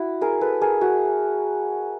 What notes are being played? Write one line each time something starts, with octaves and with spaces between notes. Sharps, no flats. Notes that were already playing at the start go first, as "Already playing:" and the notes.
Already playing: E4 F#4
G#4 A#4
A4 B4
G#4 A#4
F#4 G#4